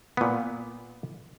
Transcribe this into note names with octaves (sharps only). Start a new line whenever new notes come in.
A#2 B3